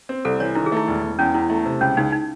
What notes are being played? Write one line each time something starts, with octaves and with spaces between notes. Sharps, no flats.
C4
C2 A4
E3 C#5
D#3 E4
G#4
A3 E4
E1
E1
E2 C#4
E2 E4
A3 E4
C3
C#2 C#4
C#2 D#4
D#4